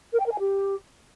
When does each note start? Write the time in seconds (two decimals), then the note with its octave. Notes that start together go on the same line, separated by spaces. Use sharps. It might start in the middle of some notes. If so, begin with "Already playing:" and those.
0.13 A#4
0.19 G5
0.26 A#4
0.32 G#5
0.39 G4